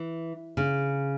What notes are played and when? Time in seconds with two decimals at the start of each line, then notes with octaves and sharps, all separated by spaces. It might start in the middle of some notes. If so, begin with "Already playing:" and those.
Already playing: E3
0.57 C#3